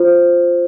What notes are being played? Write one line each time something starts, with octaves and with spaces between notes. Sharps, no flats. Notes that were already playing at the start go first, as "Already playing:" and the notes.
Already playing: F4 C5